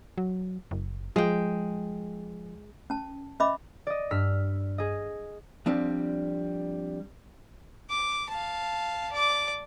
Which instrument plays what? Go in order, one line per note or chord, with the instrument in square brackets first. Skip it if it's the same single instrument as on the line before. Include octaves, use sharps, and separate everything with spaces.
[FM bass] F#3
F#1
[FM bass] F3 [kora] G#3 G5
[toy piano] C#4 A5
C#4 D#5 E5 B5 D6
[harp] D5 D#5
G2 E6 F6 B6
G#4 D#5
[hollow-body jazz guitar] F3 G3 C4 D4
[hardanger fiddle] D6
F5 A5
D5 D6